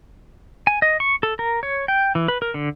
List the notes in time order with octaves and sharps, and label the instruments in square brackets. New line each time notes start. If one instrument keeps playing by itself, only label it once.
[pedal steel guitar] G#5
D#5
C#6
A4
A#4
C#5
G5
E3
B4
A#4
D3